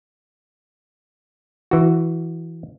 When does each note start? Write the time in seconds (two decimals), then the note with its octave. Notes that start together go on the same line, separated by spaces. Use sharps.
1.71 E3 F#4